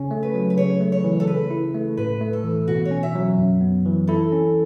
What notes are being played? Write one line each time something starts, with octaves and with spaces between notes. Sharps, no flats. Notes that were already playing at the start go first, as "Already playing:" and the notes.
Already playing: C#3 C#4
A3
B4
F#3
B4
C#3 C#5
A3
C#5
E3
A4
C#3 B4
E4
A3
A2 B4
A3
A4
E3
B2 F#4
C#5
C#4
E5
F#3
F#2
B3
E3
E4 A4
C#4